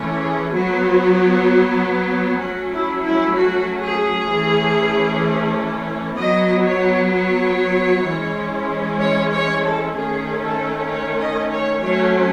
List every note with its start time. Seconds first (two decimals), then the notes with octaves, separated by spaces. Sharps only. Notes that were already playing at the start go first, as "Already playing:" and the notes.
Already playing: E3 A3 C#4
0.21 G#4
0.52 F#3 B3 F#4
2.40 F#3 A3 C#4 F#4
2.72 E4
3.03 E4
3.34 F#4
3.81 G#4
4.28 E3 A3 C#4
6.16 F#3 B3 D#5
6.64 C#5
7.11 C#5
8.06 E3 G#3 C#4
8.99 C#5
9.31 C#5
9.62 A4
9.93 D#3 A3 C#4 G#4
10.40 A4
10.88 C#5
11.19 D#5
11.50 C#5
11.81 F#3 A3 C#4 C#5